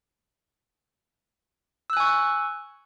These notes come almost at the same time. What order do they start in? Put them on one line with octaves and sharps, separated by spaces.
E6 F#6 G#5 C#6